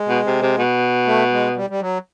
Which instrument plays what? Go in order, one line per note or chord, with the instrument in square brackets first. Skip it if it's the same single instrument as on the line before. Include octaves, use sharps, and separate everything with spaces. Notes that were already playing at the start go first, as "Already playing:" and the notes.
Already playing: [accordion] G#3
[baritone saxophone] B2
C3
C3
B2
[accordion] A3
G#3
G3
G3
F#3